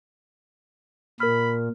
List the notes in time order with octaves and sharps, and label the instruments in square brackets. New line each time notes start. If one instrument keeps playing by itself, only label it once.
[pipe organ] A#2 [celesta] A#4 F6 [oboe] B5